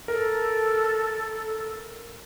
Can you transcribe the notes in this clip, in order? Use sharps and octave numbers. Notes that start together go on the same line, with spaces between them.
A4 A#4